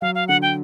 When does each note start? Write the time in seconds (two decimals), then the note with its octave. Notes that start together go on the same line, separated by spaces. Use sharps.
0.01 F#3 F5
0.15 F5
0.28 D3 F#5
0.42 G5